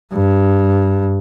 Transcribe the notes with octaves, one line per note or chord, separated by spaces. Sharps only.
G2